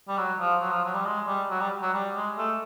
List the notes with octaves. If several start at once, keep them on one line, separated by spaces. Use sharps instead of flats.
G3
F#3
F3
F#3
F3
F#3
G3
G#3
G3
F#3
G3
F#3
G3
G#3
A3